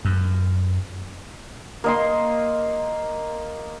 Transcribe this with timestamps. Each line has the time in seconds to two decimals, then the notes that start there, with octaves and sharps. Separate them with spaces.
0.05 F#2
1.84 A#3 D#5 C6